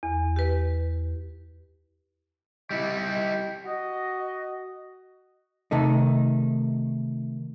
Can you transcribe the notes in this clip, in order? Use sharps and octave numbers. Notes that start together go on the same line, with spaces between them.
E2
G4 B4
G3 E4 D#5
F#4 D#5
C3 D#3 A3 D#4